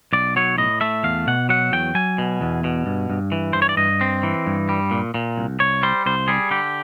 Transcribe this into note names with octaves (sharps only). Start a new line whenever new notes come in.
B1 D5
F#3 C#5
A2 D#5
A3 E5
E2 F5
B2 F#5
F#3 F#5
E2 G5
F#3 G#5
B2
E2
B2
G2
G2
E3
G2 C5
C#5
D5
G2 D#5
C4
E3
G2
G3
A#2
A#2
C2
C2 C#5
G3 C5
C2 C5
G3 G#4
D3 G4